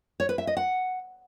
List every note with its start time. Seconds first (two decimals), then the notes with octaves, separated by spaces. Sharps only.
0.20 C#5
0.29 B4
0.38 E5
0.47 D#5
0.57 F#5